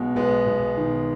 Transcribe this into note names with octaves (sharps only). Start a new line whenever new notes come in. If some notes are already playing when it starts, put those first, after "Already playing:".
Already playing: B1 B2 G#3
B1 G#3 B3
B1
D#3